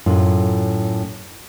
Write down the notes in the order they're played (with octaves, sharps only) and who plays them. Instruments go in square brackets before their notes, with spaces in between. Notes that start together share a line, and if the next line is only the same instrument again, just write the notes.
[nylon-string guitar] F#2 A2 F4